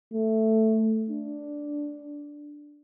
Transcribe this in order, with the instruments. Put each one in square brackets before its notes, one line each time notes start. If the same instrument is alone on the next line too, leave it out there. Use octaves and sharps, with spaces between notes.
[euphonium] A3
D4